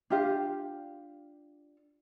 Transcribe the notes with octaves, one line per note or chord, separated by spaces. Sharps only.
D4 F4 G4 F5